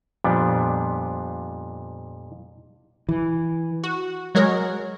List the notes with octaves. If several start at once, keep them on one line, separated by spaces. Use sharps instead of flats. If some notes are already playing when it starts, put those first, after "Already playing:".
F2 A#2 F3 G3 B3 D4
E3
F#4
F#3 G#3 F#4 A#4 C#5